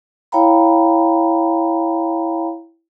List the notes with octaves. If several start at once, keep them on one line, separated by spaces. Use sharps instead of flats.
E4 C#5 F5 G5 A#5 B5